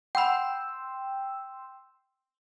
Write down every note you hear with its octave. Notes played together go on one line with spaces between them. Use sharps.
F#5 G5 B5 C6 E6